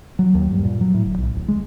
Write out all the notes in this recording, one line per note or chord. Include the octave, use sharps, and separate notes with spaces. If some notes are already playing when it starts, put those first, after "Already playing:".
F#3
D#2
G2
A#2
F#3
A2
G1
B1
D1
G#3